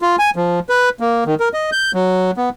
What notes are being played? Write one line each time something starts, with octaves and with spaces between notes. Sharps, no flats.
F4
G#5
F3
B4
A#3
D#3
A#4
D#5
G6
F#3
B3